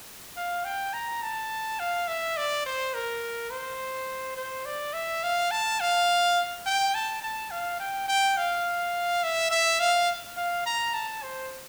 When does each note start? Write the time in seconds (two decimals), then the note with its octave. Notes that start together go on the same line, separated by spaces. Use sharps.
0.37 F5
0.65 G5
0.94 A#5
1.22 A5
1.79 F5
2.08 E5
2.37 D5
2.66 C5
2.94 A#4
3.50 C5
4.37 C5
4.65 D5
4.93 E5
5.23 F5
5.51 A5
5.80 F5
6.66 G5
6.95 A5
7.22 A5
7.51 F5
7.80 G5
8.08 G5
8.37 F5
9.23 E5
9.51 E5
9.80 F5
10.37 F5
10.66 A#5
10.94 A5
11.23 C5